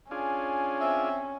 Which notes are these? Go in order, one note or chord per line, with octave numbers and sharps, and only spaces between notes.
C#4 D4 F4 G#4
C4 E5